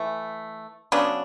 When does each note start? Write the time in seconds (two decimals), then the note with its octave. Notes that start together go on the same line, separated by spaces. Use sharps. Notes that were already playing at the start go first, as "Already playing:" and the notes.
Already playing: E3 A3
0.92 C#3 F#3 B3 D4